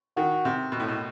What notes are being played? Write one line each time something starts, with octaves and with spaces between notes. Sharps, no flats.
D#3 F#4
C3
B2
A2
B2